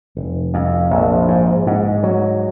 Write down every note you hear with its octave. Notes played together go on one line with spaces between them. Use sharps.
F1
F2
A#1
G#2
G#2
F#3